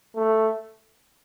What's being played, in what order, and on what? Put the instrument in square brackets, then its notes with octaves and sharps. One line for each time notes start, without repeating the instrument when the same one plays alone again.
[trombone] A3